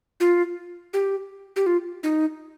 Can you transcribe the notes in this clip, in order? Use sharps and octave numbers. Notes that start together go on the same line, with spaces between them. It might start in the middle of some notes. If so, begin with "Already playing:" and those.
F4
G4
G4
F4
D#4